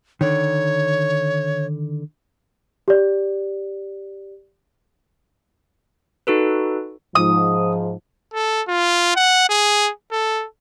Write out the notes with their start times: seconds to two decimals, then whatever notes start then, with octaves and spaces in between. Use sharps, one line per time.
0.21 D3 D#3 C#5
2.88 G4 D5
6.27 D#4 F#4 A4 B4
7.15 G#2 F3 D#6
8.33 A4
8.68 F4
9.15 F#5
9.49 G#4
10.11 A4